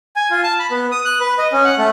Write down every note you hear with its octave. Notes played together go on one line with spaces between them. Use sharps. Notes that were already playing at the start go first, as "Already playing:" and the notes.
G#5
F4
A5
B5
B3
D#6
F#6
B4
D#5
C#4
F#5
A3